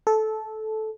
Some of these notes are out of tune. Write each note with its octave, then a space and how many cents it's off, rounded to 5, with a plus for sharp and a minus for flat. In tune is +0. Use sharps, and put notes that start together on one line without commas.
A4 -15